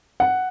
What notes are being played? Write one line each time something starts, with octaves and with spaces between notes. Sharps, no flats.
F#5